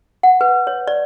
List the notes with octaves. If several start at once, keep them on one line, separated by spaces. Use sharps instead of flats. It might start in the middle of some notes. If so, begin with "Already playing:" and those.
F#5
B4
C#5
D5